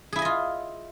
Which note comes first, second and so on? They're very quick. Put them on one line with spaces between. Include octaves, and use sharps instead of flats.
G#4 E4 G#5 D#5 F4